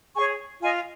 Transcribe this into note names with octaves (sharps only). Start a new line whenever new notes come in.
G#4 C#5 G#5 C#6
F4 D#5 G#5